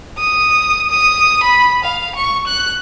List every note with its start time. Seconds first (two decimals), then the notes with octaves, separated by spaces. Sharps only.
0.19 D#6
0.91 D#6
1.43 B5
1.84 F5
2.16 C#6
2.47 F#6